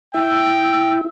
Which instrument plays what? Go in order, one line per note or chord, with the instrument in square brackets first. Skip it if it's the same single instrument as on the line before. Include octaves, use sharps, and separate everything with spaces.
[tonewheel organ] E4 [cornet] G5 [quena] E6